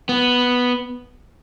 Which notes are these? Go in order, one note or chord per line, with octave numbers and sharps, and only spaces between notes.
B3